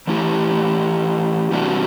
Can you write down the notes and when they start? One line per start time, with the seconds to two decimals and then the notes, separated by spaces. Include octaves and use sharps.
0.07 E3 A3 E4 G4
1.52 E2 C3 G3 D4 F#4